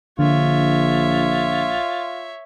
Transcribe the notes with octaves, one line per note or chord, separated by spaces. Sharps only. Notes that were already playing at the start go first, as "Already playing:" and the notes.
A#1 D3 F4 C#5 E5